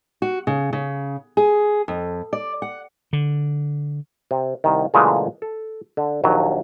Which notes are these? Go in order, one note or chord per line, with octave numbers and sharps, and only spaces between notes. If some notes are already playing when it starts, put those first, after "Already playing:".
F#4
C#3
C#3
G#4
F2
D5
F#5
D3
C3
C2 D#3
A#2 C#3 E3 F#3 G#3 A3
A4
D3
A#1 D#2 F#3